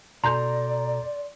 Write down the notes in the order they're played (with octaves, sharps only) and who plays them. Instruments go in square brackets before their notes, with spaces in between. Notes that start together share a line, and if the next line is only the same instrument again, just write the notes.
[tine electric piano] B2 A4 [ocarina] D5 [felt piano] A#5 [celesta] C6 G6